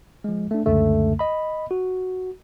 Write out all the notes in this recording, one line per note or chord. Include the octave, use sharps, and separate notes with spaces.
F3 G#3
A3 D4
C#2 F#2 D3 A3
D#5 B5
F#4